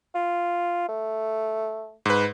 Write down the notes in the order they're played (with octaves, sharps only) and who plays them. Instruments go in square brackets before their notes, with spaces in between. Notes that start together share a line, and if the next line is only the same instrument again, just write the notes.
[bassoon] F4
A3
[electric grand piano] G#2 B4